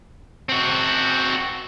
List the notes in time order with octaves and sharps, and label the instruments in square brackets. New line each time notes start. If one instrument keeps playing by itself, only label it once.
[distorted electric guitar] C4 F#4